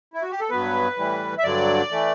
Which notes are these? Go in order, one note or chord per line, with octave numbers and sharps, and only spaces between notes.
E4
F#4
G4
A4
G2 F#3 B3 B4
A2 E3 G3
E5
G2 D3 F#3 D5
E3 A3